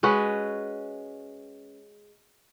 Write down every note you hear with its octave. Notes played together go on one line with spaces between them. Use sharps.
G#3 C#4 F#4 B4